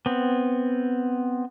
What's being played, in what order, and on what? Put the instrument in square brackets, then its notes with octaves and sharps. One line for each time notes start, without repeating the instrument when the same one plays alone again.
[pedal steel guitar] B3 C4